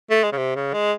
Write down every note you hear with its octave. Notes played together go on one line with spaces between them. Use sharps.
A3
G#3
C#3
C3
C#3
G#3